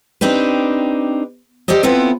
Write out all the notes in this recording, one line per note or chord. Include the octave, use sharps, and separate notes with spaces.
C4 D4 D#4 G4 B4
G4 A4 C5 D5 D#5
B3 C4 E4 F4 A4 B4